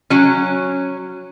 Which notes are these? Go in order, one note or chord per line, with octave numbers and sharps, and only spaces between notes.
F#3 C#4